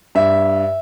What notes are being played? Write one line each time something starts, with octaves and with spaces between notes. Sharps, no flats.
G2 E5